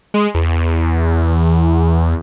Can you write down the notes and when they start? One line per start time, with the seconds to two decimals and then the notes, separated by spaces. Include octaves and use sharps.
0.14 G#3
0.35 E2